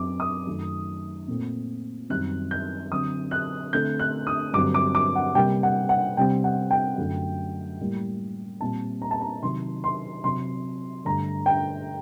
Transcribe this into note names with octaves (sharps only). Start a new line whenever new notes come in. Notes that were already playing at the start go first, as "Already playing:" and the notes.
Already playing: F#2 F#3 C4 D6
D#6
F#2 D#3 A3
A#2 A3 C4
F#2 D#3 G3 C4 F#6
G6
D3 F#3 C4 D#6
F#6
D3 A3 C4 G6
F#6
D#6
G2 D3 F#3 C4 D6
D6
D6
F#5
C3 G3 A#3 G5
F#5
F#5
C3 G3 C4 G5
F#5
G5
F#2 D3 A3
A2 G3 A#3
A#2 G3 C4 A5
A#5
A5
A#5
C3 D#3 F#3 C6
C6
C3 F#3 C4 C6
G2 D3 A3 A#5
G5